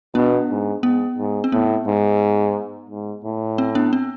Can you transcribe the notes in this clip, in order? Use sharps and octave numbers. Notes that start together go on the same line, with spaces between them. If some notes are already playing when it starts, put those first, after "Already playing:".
B2 B3 D4
G#2
G#2 B3
G#2
C4
A2 B3
G#2
G#2
A2
C4
B3 D4
C4